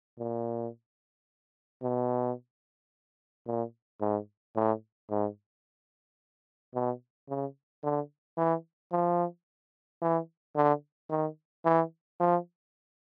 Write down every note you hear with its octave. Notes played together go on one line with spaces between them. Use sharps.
A#2
B2
A#2
G#2
A2
G#2
B2
C#3
D3
E3
F3
E3
D3
D#3
E3
F3